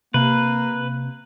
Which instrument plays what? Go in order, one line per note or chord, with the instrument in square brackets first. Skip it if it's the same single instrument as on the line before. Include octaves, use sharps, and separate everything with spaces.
[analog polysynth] C3 [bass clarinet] A#3 [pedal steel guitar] B4